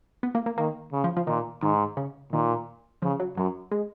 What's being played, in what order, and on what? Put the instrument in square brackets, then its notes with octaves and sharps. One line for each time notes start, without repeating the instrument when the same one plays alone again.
[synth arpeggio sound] B3
A#3
A#3
[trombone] D#3 [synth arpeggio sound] A#3
[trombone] C#3
[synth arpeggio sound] F3
F3
[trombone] A#2 [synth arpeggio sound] D#3
[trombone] G#2 [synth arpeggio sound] D#3
[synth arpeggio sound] C#3
[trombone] A#2 [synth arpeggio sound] D#3
[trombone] C#3 [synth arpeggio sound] F3
[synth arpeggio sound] F#3
[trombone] F#2 [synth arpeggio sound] F#3
[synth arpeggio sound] G#3